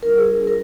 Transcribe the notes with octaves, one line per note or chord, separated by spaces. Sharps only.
G3 D4 F4 A#4
G#4
A#4